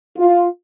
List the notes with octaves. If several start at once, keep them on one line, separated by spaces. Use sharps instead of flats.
F4